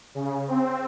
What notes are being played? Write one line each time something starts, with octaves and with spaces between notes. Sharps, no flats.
C#3
C4